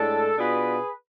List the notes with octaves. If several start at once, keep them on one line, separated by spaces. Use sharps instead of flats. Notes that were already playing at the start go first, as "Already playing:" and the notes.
Already playing: A2 G#3 D4 A4
B2 B3 D4 F4 G#4 B4